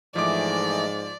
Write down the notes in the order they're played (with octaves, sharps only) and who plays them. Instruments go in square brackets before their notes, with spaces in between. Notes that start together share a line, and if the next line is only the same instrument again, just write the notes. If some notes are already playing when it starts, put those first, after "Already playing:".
[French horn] G#2 [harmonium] E3 A3 D#5 [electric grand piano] F3 D6 [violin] D5